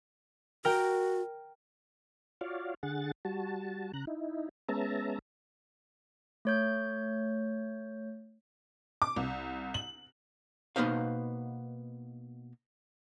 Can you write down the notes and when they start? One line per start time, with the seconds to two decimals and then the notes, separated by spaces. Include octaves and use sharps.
0.65 F#4 A#4 G5
2.41 F4 F#4 C#5 D5 F5
2.83 D3 G#4 F#5 A6
3.25 G3 F#4 A5
3.94 C#3 A#5 F#6
4.07 D#4 E4
4.69 G#3 B3 C#4 E5 A5 A#5
6.45 A3 C#5 G6
9.02 D6
9.16 C2
9.74 F#7
10.76 B2 A#3 B3 D#4 C5 F5